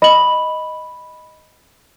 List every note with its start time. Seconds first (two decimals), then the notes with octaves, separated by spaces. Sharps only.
0.02 D#5 B5 F#7